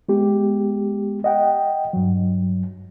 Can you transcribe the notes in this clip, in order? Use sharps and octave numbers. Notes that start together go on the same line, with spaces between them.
G#3 B3 G4
D#5 F#5 G5
G2 F#3